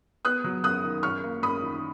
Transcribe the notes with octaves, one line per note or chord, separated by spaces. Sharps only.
B3 D#6 F#6
F#3
F#2 D#6 F#6
D#3
F#2 C#6 F6
A#3
F#2 B5 D#6
D#3